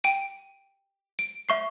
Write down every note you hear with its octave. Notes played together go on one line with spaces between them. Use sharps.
G5 D7 D#7
D7
E5 C#6 C7